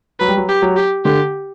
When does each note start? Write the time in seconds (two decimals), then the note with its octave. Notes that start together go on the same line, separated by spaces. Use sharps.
0.20 F#3 B4
0.29 G3
0.37 F#3
0.49 G4
0.62 F#3
0.76 G4
1.05 D3 G4